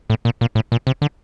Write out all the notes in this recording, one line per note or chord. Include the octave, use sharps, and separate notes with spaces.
A2
A#2
A#2
A2
A#2
C3
D3